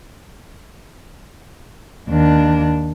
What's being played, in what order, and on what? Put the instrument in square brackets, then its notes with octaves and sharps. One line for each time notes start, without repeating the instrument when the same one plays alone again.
[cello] D#2 D4